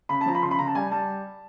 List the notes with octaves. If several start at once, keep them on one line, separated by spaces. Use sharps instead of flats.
C#3 B5
A5
F3 A#5
B5
C#3 C6
B5
C#3 A#5
A5
G3 G#5
G3 A5